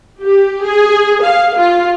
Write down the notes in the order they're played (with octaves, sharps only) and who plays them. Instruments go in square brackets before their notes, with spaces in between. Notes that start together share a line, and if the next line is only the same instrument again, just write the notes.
[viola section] G4
G#4
F5
F4